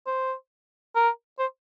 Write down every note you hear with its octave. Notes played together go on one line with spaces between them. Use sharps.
C5
A#4
C5